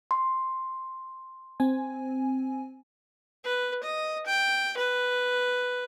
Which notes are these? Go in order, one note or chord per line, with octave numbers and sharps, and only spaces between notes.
C6
C4 G#5
B4
D#5
G5
B4